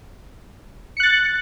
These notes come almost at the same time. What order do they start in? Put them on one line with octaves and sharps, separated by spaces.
C#7 F#6 A6